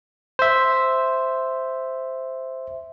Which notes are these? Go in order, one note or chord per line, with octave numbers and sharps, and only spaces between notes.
C5 E5